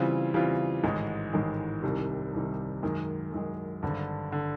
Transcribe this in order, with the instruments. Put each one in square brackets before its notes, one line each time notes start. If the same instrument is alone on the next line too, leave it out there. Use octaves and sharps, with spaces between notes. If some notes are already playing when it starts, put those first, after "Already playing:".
Already playing: [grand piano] C#3 E3 G3 C4 F4
C#3 E3 G3 C4 F4
A1 G#2 D#3 G#3
A1 G#2 D#3 G#3
C2 C3 D#3 G3
C2 C3 D#3 G3
F#2 D#3 G#3
F#2 D#3 G#3
G#1 G2 D3
D3